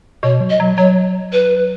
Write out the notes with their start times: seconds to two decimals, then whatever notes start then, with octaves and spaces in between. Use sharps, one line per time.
0.23 B2 C#5
0.41 F#3
0.50 D#5
0.60 F#3
0.78 F#3 C#5
1.33 B4